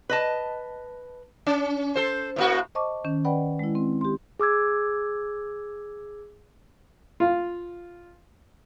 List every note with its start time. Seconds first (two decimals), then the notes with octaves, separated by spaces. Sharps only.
0.09 B4 D#5 A5
1.46 C#4
1.95 A4 C5
2.36 A2 A#3 F#4
2.75 C5 D#5 A5 C#6 D6
3.04 D#3 C#4
3.25 B4 D5 F#5 G5 B5
3.59 G#3 E4
3.75 C4
4.01 G4 C6
4.40 G#4 D6 E6 G#6
7.20 F4